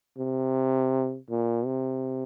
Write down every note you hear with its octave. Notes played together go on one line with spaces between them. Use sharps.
C3
A#2
C3